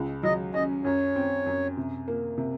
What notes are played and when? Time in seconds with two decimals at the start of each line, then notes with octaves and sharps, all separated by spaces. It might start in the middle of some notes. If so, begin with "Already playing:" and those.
Already playing: C#2 G#3
0.23 F#3 D#5
0.54 C#4 D#5
0.84 F#2 C#5
1.16 C4
1.46 F#2
1.77 C3
2.08 A#3
2.38 C3